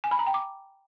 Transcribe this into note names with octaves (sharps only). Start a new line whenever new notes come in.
G#5
B5
A#5
G5
D6